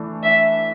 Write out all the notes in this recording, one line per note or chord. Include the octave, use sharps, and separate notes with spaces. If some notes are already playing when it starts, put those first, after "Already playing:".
Already playing: E3 A3 D4
E5